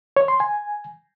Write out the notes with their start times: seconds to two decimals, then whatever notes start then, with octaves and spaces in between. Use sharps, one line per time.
0.17 C#5
0.28 C6
0.40 G#5